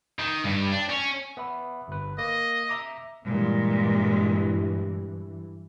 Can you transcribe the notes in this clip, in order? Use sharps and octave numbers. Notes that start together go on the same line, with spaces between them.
D#3
G2
D4
C#4
B3 E5 B5
G1 B4
A#3 D#5
E5 A#5 D6
G2 A#2 E3 G#3